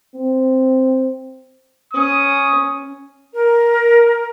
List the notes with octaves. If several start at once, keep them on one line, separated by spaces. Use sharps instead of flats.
C4
C#4 D#6
A#4